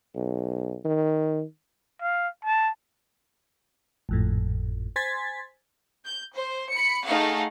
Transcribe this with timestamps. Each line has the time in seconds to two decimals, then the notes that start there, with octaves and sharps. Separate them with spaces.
0.15 B1
0.85 D#3
2.02 F5
2.45 A5
4.09 G#1 F2 A2
4.96 C5 G#5 C6 G#6 A6 B6
6.06 G6
6.35 C5
6.71 B5 C#7
7.05 A3 D#4 G#4 F5 F#5